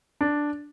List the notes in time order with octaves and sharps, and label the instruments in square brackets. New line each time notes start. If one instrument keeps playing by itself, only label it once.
[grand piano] D4